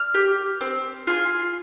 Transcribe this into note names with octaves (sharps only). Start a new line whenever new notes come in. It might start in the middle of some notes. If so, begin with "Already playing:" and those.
Already playing: F6
G4
C4
F4 G#4